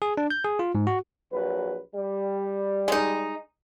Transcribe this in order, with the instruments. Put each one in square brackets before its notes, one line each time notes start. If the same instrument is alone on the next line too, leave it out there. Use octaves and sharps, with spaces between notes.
[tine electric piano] G#4
D4
G6
G#4
F4
G#2
F#4
[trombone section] A#1 F#3 B4
G3
[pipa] G#3 D#4